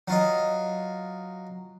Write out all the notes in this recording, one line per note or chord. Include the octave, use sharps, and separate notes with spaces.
F#3 F4 D#5